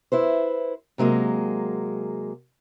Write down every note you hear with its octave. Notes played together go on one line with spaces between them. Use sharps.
E4 B4 C5
C3 F#3 G#3 A#3